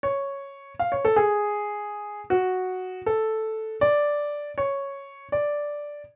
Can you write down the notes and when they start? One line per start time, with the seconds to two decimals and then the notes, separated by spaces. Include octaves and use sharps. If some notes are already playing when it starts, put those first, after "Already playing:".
0.03 C#5
0.79 F5
0.92 C#5
1.05 A4
1.16 G#4
2.30 F#4
3.06 A4
3.81 D5
4.58 C#5
5.32 D5